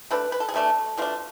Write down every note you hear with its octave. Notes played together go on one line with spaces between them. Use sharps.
B2 A3 D4 B4
B4
A4
G#4
B2 A3 D4 A4
B2 A3 D4 F4